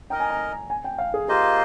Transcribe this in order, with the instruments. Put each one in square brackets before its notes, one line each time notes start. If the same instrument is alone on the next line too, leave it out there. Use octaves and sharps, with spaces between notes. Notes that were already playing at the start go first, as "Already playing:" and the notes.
[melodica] D#4 A#4 D#5 [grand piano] G5
[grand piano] G#5
A#5
G#5
G5
F5
G#4
[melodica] A#3 F4 C5 D#5 [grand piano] G4